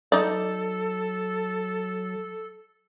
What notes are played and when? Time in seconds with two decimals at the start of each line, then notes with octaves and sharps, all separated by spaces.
0.12 F#3 D#4 A4 D5